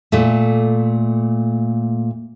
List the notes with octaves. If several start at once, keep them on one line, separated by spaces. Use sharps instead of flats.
A#2 A3